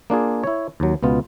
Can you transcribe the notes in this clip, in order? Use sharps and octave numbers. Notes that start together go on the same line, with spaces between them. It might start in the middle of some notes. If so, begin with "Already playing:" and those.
A#3 D4 F4 G#4
E4 C#5
D#2 F#3
C#2 B2 B3 F4